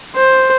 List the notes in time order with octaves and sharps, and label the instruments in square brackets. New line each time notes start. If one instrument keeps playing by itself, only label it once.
[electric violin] C5